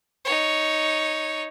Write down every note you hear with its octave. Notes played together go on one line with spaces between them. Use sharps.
D#4 C#5